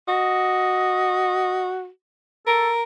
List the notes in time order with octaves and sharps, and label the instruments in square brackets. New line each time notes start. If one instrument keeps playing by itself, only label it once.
[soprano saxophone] F#4 [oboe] D#5
[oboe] A4 [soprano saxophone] A#4